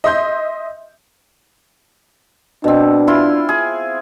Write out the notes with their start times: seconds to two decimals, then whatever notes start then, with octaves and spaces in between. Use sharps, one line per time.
0.04 D#5 E5 C6 G6
2.64 B2 C4 D4
3.07 E4 F4 C6
3.49 G#4